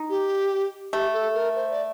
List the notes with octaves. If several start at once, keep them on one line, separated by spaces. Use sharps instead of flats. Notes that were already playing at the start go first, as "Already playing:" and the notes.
Already playing: D#4
G4
A3 G4
A4
A#4
C5
D5